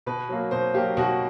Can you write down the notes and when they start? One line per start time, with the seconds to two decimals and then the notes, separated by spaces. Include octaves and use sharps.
0.06 B2 B4
0.29 F#3 A#3
0.51 B2 C5
0.74 F#3 A#3 G4
0.97 B2 F#4